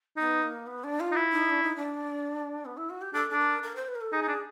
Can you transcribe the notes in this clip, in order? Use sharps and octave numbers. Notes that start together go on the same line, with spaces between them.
B3 D#4
A#3
B3
D4
F4
D#4
E4
D#4
D4
D#4
D4
B3
E4
F#4
G4
D4 A4
D4 A4
A#4
A#4
C5
B4
A#4
A4
D#4 G#4
D#4
D4